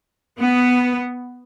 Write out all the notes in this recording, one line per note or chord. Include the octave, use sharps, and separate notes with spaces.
B3